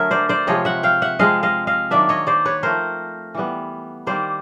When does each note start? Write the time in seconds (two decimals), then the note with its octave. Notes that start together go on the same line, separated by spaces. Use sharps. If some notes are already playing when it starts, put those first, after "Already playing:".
Already playing: D3 F#3 A3 G#4 A#4 E5
0.11 C5 D5
0.29 C5 D5
0.47 C3 F3 G#3 C#5 D#5
0.65 E5 F#5
0.83 F5 G5
1.02 E5 F#5
1.19 F3 G#3 C4 D#5 F5
1.43 D#5 F5
1.67 D#5 F5
1.91 D#3 F#3 A#3 D4 D5 E5
2.09 C#5 D#5
2.27 C5 D5
2.45 B4 C#5
2.63 F3 A3 C4 A#4 C5
3.35 E3 G3 B3
4.06 D#3 G3 A#3 C5 D5